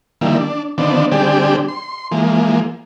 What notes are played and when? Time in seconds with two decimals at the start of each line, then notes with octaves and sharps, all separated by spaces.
0.21 D3 D#3 F3 G3 A#3 E4
0.38 D4
0.78 D3 D#3 F3 B3 C4 D4
1.12 D3 G3 C4 D4 G4 G#4
1.68 C6
2.12 E3 F3 G#3 A#3